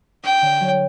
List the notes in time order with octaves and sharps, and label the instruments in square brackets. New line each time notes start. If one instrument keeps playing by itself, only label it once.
[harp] D4 [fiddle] G5
[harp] D3
F#3